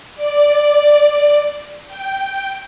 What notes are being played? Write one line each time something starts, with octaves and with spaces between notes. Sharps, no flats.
D5
G5